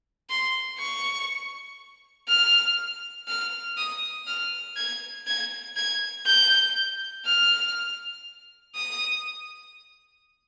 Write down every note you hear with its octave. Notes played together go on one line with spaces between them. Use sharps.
C6
C#6
F6
F6
D#6
F6
G#6
G#6
G#6
G6
F6
D#6